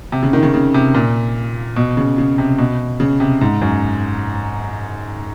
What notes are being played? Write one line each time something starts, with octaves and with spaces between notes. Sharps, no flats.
C3
C#3
D#3
C#3
C#3
C3
A#2
B2
C#3
C#3
C3
B2
C#3
C3
G#2
F#2